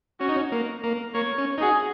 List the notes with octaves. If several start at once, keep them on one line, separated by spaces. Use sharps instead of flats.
C#4 F#4
D#4
C#4
A#3
A#3
A#3 C#5
C#4
D#4
F#4 G#4